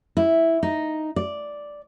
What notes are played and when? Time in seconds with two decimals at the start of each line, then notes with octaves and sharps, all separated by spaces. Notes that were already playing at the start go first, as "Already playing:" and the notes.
0.17 E4
0.63 D#4
1.16 D5